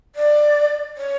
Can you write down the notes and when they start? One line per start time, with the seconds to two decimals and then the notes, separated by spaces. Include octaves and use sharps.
0.16 D5
0.97 C#5